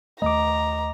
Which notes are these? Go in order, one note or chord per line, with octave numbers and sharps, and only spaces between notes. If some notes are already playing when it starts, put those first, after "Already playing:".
D#2 A3 D#5 A#5 D6